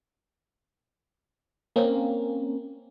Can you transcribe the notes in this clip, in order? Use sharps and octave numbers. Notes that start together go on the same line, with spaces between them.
A#3 C4 C#4